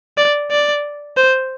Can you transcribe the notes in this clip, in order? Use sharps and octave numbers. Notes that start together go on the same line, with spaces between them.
D5
D5
C5